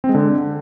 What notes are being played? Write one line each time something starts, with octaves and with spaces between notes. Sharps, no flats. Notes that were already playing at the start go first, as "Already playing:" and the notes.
C4
G#3
D3